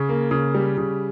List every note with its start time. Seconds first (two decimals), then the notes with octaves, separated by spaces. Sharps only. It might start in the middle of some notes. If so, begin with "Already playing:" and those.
Already playing: C#3
0.09 A#3
0.31 C#3
0.54 G3
0.78 C#3